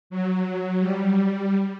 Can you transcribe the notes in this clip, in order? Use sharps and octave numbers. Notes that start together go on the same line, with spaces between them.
F#3
G3